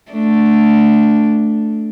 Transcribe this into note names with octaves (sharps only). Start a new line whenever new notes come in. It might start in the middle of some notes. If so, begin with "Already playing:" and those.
A3 D4